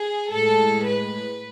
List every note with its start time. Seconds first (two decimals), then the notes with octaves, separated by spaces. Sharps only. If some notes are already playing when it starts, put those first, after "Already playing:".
Already playing: G#4
0.31 A2 G#3 A4
0.85 B4